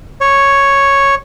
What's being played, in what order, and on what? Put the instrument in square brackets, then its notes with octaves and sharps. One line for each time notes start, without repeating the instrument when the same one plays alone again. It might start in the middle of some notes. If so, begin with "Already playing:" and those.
[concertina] C#5